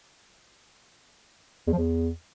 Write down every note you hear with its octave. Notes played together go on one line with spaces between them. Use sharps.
E2
F3
E2